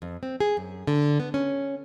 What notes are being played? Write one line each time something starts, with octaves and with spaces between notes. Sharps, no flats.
F2
C4
G#4
F#2
D3
B3
C#4